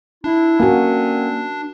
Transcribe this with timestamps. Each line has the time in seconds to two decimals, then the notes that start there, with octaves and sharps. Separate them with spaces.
0.24 D4 E4
0.60 D3 A#3 C4 C#4 F#4 A#4